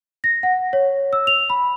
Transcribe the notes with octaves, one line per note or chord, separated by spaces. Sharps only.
A#6
F#5
C#5
E6
F7
B5